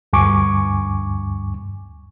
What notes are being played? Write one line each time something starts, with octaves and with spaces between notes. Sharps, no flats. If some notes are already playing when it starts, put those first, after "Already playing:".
D2 G2 G#5 C#6 D6